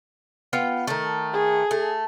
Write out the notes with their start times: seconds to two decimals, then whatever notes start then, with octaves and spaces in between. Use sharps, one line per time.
0.53 B3 F4 G5
0.87 D#3 A3
1.33 G#4
1.71 A3